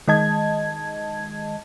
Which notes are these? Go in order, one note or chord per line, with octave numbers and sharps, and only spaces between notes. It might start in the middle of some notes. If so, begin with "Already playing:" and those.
D#3 G#3 D#5 A5 G#6